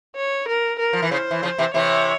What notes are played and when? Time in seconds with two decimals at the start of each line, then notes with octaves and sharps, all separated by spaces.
0.17 C#5
0.48 A#4
0.79 A#4
0.93 F3
1.02 E3
1.11 C#3 C5
1.31 E3
1.43 C#3 F3
1.59 C3 E3
1.74 C3 E3 C#5